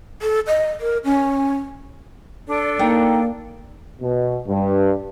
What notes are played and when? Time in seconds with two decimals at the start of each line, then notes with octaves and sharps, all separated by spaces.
0.22 A4
0.47 D#5
0.81 A#4
1.04 C#4
2.48 D4 A4 D5
2.79 A#3 D#4 G5
4.02 B2
4.48 G2